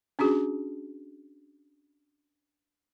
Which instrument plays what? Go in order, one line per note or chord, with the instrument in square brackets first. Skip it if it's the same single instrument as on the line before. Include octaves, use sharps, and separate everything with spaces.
[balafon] C#4 D4 F#4 G#4